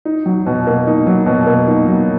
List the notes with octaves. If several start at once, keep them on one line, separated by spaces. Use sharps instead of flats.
D#4
F#3
B2
A#3
D#4
F#3
B2
A#3
D#4
F#3